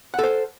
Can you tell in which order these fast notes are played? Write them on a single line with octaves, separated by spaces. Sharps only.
F#5 A4 C5